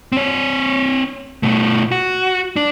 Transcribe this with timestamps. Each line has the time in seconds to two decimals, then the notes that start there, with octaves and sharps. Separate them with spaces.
0.12 C4 C#5
1.43 B2 A3
1.92 F#4
2.56 D4